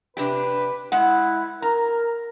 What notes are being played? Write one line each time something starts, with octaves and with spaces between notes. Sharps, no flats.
C3 D4 G4 B4
G#3 E4 F#5
A#4 A#5